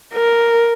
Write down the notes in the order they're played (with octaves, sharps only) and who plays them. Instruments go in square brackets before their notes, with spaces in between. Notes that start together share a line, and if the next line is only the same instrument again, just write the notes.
[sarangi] A#4